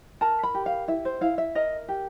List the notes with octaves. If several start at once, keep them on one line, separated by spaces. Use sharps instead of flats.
A#4 A5
B5
G4
F5
E4 E5
C5
E4 F5
E5
A#4 D#5
G4